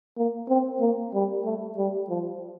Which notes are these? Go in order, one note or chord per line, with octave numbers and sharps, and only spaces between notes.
A#3
C4
A#3
G3
A3
G3
F3